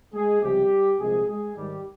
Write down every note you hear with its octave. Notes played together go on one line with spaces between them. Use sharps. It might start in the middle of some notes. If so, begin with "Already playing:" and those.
G#3 G#4
C#2 C3 F3 G3 G4
C2 A#2 F3 G#3 G#4
G#3 G#4
G#2 D#3 G3 G4